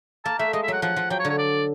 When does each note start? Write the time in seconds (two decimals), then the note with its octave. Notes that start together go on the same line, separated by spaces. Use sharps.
0.25 A#3 A5
0.39 A3 E5
0.53 G#3 D#5
0.63 E5
0.68 F#3 F#5
0.82 F3 F#5
0.96 F3
1.10 F#3 G5
1.20 C#5
1.25 D3
1.30 C#5
1.38 D5